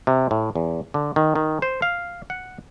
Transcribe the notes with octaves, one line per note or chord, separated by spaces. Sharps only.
C3
A2
E2
D3
D#3
D#3
C5
F5
F#5